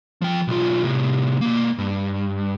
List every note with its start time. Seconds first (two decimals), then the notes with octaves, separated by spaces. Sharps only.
0.22 F3 G5
0.48 B1 F4
0.84 A2 C3
1.41 B2 A#3
1.78 G2